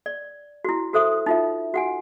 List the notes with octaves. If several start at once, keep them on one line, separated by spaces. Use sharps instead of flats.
D5
E4 F#4
F#4 A4 C5 E5 D#6
D#4 F4 E5
F#4 F#5 G#5